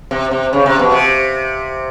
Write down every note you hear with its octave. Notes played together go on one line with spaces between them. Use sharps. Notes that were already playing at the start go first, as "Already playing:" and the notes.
C3
C3
C#3
C3
B2
C3